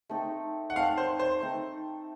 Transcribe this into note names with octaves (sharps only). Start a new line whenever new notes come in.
A3 C4 D#4 A4
F#5
A3 C4 D#4 A4 F5
C5
C5
A3 C4 D#4 A4